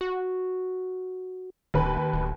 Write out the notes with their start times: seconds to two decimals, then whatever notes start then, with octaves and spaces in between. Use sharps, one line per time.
0.01 F#4
1.74 D1 D#2 B4 B5
2.13 D1